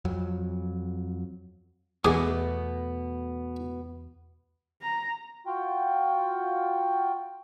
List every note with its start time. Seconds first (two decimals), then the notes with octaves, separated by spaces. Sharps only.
0.05 F2 F#3
2.05 E2 B2 A3 B3 G#4 D6
4.82 A#5
5.46 F4 F#4 G5